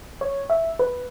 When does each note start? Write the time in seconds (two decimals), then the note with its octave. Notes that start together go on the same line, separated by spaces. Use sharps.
0.21 C#5
0.50 E5
0.79 B4